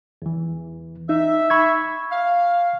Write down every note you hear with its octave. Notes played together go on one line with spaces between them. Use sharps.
E2 E3
D#4 E5
B5 C#6 G#6
F5